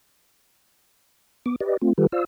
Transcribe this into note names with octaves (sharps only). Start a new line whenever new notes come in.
B3 D6
G4 B4 D5 D#5
A3 C4 F4
D#3 G3 F4 G4 A4 B4
F4 C5 D5 F5 E6